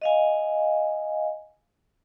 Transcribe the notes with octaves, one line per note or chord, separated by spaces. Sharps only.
D#5 F5 G#5